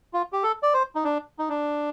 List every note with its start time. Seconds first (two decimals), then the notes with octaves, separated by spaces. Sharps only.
0.13 F4
0.33 G4
0.43 A4
0.63 D5
0.74 C5
0.95 D#4
1.04 D4
1.39 D#4
1.49 D4